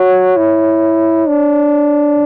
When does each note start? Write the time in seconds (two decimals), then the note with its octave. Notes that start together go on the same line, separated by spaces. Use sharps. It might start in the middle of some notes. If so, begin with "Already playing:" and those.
Already playing: F#4 C#5
0.37 E4
1.28 D4